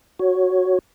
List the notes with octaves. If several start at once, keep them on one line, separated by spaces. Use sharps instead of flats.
F#4 C#5